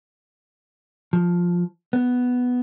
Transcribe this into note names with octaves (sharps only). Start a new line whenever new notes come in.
F3
B3